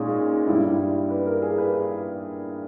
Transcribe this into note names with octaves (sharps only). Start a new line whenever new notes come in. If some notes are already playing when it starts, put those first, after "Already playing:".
Already playing: A#2 G#3 C#4 D#4
G2 G3 E4
B4
A#4
G#4
B4